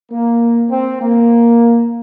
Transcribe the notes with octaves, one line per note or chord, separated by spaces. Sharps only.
A#3
C4
A#3